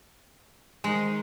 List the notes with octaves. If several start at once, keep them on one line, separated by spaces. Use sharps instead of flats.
D#3 G#3 D#4 C5